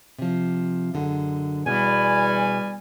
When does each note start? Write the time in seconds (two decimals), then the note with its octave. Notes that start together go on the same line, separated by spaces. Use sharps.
0.19 C3 F3
0.94 F#2 D3 G#3
1.66 E2 B2 G3 G#5